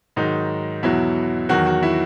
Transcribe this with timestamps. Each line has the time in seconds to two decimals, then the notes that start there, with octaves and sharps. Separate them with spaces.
0.16 G#2 D#3 F#3 D#4
0.83 E2 B2 F#3 E4
1.49 E2 D#3 F#3 F#4
1.67 F#4
1.83 E4